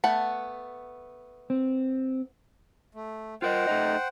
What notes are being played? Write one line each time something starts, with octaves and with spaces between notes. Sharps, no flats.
A3 B3 F#5
C4
A3
F4 A#4 C5 D#5 F#5 G5
A3 D#4 D#5